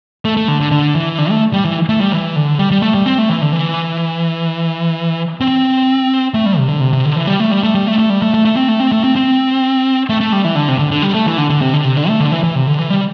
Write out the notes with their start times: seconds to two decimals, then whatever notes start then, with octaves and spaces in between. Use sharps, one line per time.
0.25 A3
0.37 A3
0.48 D3
0.60 D3
0.72 D3
0.95 E3
1.18 D3
1.30 A3
1.53 G3
1.65 E3
1.89 A3
2.01 G3
2.12 E3
2.36 D3
2.59 G3
2.71 G3
2.82 A3
2.94 G3
3.06 C4
3.18 A3
3.29 E3
3.42 D3
3.53 E3
5.41 C4
6.34 A3
6.46 G3
6.58 C3
6.69 D3
6.80 C3
6.93 C3
7.05 D3
7.16 E3
7.27 G3
7.40 A3
7.51 G3
7.63 A3
7.75 G3
7.87 A3
7.99 A3
8.10 G3
8.22 A3
8.34 A3
8.45 A3
8.57 C4
8.68 A3
8.80 C4
8.92 A3
9.04 C4
9.16 C4
10.09 A3
10.21 A3
10.32 G3
10.44 E3
10.56 D3
10.68 C3
10.79 D3
10.91 D3
11.02 G3
11.14 A3
11.26 E3
11.38 D3
11.50 D3
11.61 C3
11.73 D3
11.85 C3
11.97 D3
12.08 A3
12.20 D3
12.32 E3
12.44 E3
12.55 C3
12.67 D3
12.79 E3
12.90 G3